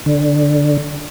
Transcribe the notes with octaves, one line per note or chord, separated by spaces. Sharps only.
D3